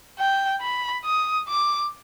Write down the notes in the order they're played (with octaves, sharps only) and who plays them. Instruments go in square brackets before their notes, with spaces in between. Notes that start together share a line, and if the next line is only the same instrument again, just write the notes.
[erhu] G5
B5
D#6
D6